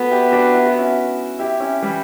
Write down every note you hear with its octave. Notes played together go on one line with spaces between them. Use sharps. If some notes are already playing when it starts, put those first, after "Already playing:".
Already playing: B3 F#4 A4
E4 G4
D4 F#4
E4
F#4
C#4 E4
E4 G4
C#4 E4
E3 G3